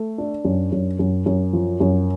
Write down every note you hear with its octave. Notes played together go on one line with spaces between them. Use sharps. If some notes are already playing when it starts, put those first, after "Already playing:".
Already playing: A3
D4
F#2
F#2
F#2
F#2
F3
F#2